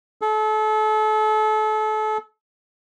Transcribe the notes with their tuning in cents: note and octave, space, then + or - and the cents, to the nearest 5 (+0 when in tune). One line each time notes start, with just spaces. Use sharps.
A4 -35